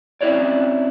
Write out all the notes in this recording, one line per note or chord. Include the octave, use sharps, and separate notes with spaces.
C4 C#4 E4 F#4 C#5 D5